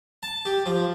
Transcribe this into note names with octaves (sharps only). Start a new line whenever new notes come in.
A5
G4
F3